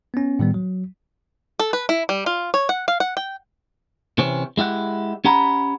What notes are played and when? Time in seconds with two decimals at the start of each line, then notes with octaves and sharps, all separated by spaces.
0.14 B3 C#4
0.39 A2 D#3 G3 B3
0.54 F#3
1.60 A4
1.73 B4
1.89 E4
2.09 G3
2.26 F4
2.54 C#5
2.69 F#5
2.88 F5
3.00 F#5
3.17 G5
4.18 C3 E3 C4 C#4
4.57 G#3 E4 G4 F#5
5.25 C#4 G4 F#5 A#5 B5